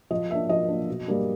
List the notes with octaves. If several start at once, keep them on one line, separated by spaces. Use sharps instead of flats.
F3 D#5
A#3 D4 E5
F3 D#5
A#3 D4
B2
G3 A#3 D4